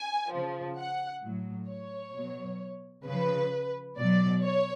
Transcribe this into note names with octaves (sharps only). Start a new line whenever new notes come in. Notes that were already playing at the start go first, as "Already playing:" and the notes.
Already playing: G#5
C#3 F3
F#5
A2 F#3
C#5
B2 F#3
C#3 F3 B4
B2 F#3 D5
C#5